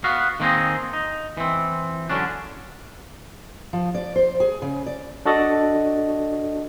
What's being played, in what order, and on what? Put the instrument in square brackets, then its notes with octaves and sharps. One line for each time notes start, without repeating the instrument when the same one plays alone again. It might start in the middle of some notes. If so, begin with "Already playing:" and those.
[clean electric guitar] B3 F#4 F5
D#3 A#3 C4 D#4 G#4
D#4
E3 C4
D3 F#3 C#4 D4
[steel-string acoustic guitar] F3
D5
C5
G#4
C#3
D5
[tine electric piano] D4 F#4 A4 D5 D#5